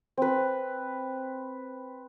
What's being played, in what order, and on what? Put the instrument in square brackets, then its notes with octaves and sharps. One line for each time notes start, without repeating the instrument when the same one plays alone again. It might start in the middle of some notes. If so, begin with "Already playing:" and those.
[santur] C4 B4